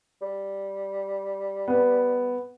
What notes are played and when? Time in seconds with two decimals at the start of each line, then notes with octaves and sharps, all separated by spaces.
0.22 G3
1.68 B3